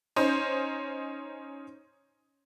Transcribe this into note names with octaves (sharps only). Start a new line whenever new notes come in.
C#4 D#4 C5